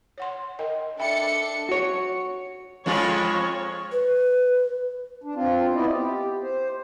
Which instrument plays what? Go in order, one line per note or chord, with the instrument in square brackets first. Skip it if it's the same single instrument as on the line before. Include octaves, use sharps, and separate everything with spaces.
[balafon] C#5 F#5 C6
A#4 D#5 G5
[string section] D4 A4 C#7 [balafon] E5 G5 B5
[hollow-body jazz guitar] F#4 C#5
[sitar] F2 G#3 F4 [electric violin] C#5
[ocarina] B4
[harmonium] D4
C4 F4
B3 E4 D5 D#5
G4
C5